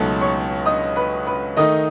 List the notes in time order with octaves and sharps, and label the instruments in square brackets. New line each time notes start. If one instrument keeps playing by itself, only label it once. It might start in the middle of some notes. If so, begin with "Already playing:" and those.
Already playing: [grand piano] C#2 B2 F#3 A3 D#4 [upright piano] A4 A5
[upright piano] C#5 C#6
D#5 D#6
B4 B5
B4 B5
[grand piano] D#3 A3 D#4 [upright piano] D#5 D#6